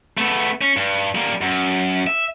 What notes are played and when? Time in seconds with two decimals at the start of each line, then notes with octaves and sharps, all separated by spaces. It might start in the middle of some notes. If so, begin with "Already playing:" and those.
0.17 A3 B3
0.61 C#4
0.77 G2
1.15 G3 A#3
1.41 F#2
2.07 E5